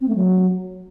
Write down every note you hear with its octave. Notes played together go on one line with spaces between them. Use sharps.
C4
A3
F#3